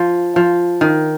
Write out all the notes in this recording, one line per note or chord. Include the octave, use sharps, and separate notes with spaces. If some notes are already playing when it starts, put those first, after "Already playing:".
Already playing: F3
F3
D#3